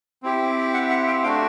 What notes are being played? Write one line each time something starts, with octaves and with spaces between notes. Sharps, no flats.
C4 E4 G4
E5 F#5
E5 F#5
F5 G5
A3 D4 F#4 F5 G5